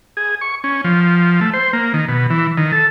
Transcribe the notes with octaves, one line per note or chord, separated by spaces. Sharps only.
G#4
C#6
C#4
F3
A3
C5
A#3
D#3
B2
E3
D#3
A4